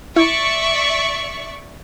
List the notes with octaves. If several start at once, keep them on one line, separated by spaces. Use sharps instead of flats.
E4 D5 E5 C#6